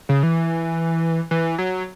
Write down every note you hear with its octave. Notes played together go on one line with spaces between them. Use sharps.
C#3
E3
E3
F#3